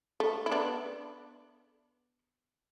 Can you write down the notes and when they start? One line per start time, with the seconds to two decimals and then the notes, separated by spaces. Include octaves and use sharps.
0.20 A3
0.46 E4
0.51 B3 D4